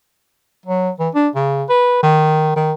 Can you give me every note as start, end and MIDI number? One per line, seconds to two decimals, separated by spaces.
0.66 0.90 54
1.00 1.09 52
1.15 1.29 62
1.35 1.64 49
1.69 2.03 71
2.03 2.53 51
2.56 2.73 51